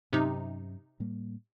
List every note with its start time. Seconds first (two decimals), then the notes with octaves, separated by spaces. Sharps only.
0.13 G2 C3 F#3 C#4 D#4
1.00 A2 G3 A#3